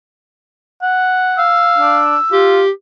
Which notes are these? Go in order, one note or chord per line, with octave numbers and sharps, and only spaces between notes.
F#5
F5 E6
D4
F4 G4